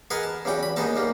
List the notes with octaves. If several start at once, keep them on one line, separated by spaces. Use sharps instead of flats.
G#4 A#4 B4 D#5 F#5 G#5
A5
E2 C#3 G3 F#4 G5
B5
D#2 G#3 B3 D#4 D#5 A5
G3 A#3